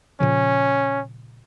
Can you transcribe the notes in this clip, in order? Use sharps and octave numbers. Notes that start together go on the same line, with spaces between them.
A#2 C#3 F3 C#4